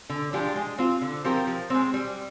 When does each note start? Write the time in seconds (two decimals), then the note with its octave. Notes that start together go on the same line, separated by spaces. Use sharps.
0.10 D3
0.33 F3 G#3 D4 G4
0.56 G#3
0.78 C4 F4
1.02 D3
1.24 F3 C4 G4 A#4
1.47 F3
1.70 G#3 C4
1.94 G3